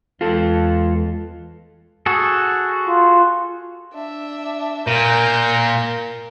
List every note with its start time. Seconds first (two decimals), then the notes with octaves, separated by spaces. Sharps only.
0.21 E2 E3 G#3 F4 A4
2.06 F#4 G#4 A4
2.87 F4
3.93 D4 E5
4.87 A#2 A#4 G6 A#6